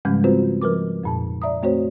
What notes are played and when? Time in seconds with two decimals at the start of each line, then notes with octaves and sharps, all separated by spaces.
0.05 G#2 C#3 F3 G3 G#3 C#4
0.24 C4 F4 F#4 B4 C5
0.62 F3 A#4 B4 D6
1.03 F2 A#2 A5
1.42 D5 E5 A#5 D#6
1.63 A3 C4 F#4 C5 C#5